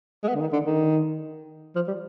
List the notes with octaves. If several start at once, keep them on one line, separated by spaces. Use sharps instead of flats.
G#3
B3
D3
D#3
D3
D#3
F3
G3